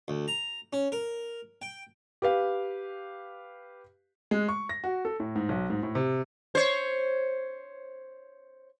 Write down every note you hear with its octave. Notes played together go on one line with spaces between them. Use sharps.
D2
A#5
C#4
A#4
G5
G4 B4 F5
G#3
C#6
A#6
F#4
A4
A2
G#2
B1
G#2
A2
C3
C5 C#5